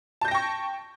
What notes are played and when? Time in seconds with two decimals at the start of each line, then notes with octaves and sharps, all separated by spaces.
0.21 A5
0.25 G6
0.28 A#6
0.31 G5
0.35 C#6